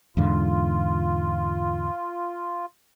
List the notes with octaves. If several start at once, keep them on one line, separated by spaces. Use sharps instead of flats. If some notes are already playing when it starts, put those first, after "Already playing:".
E2 G#2 D3 F4